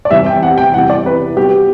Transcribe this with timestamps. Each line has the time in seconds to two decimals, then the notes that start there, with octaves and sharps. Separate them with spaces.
0.05 D5
0.11 E2 C3 E3 G3 C4 E5
0.26 G5
0.43 F#5
0.58 G5
0.74 E2 C3 E3 G3 F#5
0.90 D5
1.06 B4
1.37 G3 B3 F#4 G4